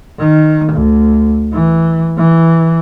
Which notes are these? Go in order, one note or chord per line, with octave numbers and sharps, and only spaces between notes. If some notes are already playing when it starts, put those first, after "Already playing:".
D#3
D2
E3
E3